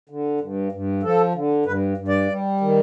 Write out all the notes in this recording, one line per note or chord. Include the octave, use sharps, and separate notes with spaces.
D3
G2
G2
F3 A4
D3
G2 B4
G2
D5
G3
D#3